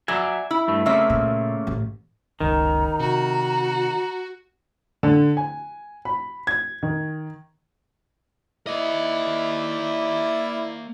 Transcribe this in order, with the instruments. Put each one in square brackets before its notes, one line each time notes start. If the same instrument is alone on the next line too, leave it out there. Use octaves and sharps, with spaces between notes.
[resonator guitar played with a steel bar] F#3 [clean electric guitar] D5 E5 G#5
[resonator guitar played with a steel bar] E4
[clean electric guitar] G2 A3
[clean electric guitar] C#3 A3 A#3 [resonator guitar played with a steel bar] C4 E5
[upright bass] A#2
A1
[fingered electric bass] F#1 C#2 [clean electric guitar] D#3 [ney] A#5
[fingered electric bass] C3 [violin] F#4
[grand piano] D3
G#5
B5
G#6
D#3
[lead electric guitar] A#3 D#5 [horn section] E4 D5